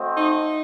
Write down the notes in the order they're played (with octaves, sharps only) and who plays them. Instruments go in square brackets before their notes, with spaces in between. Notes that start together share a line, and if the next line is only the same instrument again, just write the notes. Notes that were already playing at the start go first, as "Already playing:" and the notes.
Already playing: [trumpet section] A3 C4 F#4 C5 D#5
[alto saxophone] D#4